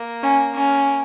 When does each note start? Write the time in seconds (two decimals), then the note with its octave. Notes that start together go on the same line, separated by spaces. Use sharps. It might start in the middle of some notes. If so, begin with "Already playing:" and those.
Already playing: A#3
0.23 C#4
0.54 C#4